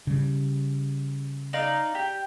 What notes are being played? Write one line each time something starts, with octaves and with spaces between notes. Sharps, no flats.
C#3 G3
D#4 D5 F5
G4